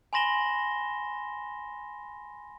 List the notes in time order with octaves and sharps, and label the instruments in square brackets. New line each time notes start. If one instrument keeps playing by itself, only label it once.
[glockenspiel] G#5 B5 C6 A#6 E7 G7